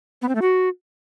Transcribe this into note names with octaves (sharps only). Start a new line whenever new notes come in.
B3
C4
A3
F#4